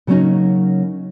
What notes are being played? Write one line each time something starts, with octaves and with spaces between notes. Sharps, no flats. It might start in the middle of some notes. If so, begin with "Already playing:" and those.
C#3 F#3 A#3 C4 C#4 D#4